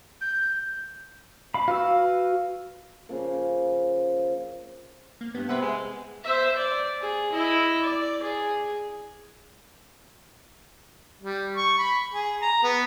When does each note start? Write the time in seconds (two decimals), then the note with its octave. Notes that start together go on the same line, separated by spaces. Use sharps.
0.21 G6
1.54 F5 B5
1.68 F#4 B4 F5 E6
3.09 C#3 F3 A#3
5.21 A#3
5.35 G2 B3
5.49 C3 B4 E5 F#5
5.62 G#3
6.23 C5 E5
6.57 D5
7.01 G#4
7.32 E4 D#5
7.82 D5
8.23 G#4
11.22 G3
11.56 C#6
11.78 B5
12.14 G#4
12.42 A#5
12.63 B3